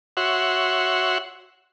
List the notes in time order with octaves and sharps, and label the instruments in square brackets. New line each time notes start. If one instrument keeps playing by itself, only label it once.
[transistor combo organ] F#4 C#5 E5 F#5 C6